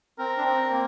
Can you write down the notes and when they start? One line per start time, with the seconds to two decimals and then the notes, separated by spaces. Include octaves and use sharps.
0.19 C4 A#4
0.37 D4
0.45 C4
0.71 A#3